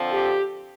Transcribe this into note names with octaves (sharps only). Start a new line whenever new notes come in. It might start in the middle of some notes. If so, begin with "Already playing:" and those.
Already playing: F2 D3 F3 C4
G4